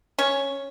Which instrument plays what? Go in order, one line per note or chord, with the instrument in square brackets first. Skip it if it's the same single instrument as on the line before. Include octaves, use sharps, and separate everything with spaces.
[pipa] C#4 C#5